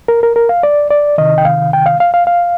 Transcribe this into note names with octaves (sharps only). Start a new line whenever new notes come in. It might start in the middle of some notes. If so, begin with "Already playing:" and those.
A#4
A#4
A#4
F5
D5
D5
C3 D#3 D#5
G5
F5
G5
F5
F5
F5
F5